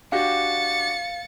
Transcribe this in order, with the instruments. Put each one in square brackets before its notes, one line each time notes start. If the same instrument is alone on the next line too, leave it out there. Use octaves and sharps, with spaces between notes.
[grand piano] D4 F#4 G4 [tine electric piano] F5 [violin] A6 C#7